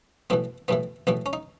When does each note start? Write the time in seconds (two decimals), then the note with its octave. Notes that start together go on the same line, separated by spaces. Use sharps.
0.30 B1 A2 E3 B3
0.68 B1 A2 E3 B3
1.07 B1 A2 E3 B3
1.26 C#4
1.33 D#4